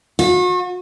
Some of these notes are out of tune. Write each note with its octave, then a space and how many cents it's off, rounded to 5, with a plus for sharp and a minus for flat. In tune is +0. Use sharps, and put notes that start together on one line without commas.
F#4 -40